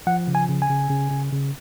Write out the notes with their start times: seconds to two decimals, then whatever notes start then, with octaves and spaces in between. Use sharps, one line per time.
0.07 F3 F#5
0.28 C#3
0.35 G#5
0.49 C#3
0.62 G#5
0.70 C#3
0.90 C#3
1.11 C#3
1.32 C#3